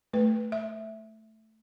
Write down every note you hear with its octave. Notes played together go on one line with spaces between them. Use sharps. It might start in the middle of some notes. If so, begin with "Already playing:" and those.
A3 B4
E5